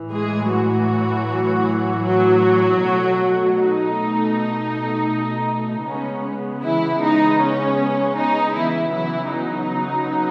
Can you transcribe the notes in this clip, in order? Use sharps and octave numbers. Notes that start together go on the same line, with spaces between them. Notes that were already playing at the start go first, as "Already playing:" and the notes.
Already playing: A2 E3
G#3 G#4
F#3 F#4
F#3 F#4
B2 A3
D#4
C#3 G#3 B3 C#4
E3 E4
D#4
C#4
D#4
E3 E4
C#3 E3 F#3 B3 E4
D#4